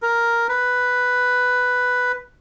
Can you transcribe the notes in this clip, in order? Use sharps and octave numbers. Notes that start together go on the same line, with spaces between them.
A#4
B4